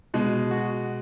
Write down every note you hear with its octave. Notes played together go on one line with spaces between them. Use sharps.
B2 G#3
F#4